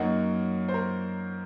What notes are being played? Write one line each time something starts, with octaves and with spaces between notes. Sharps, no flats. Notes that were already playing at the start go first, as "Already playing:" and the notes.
Already playing: F#2 F#3 A#3 D#4 F#5
C5
A#4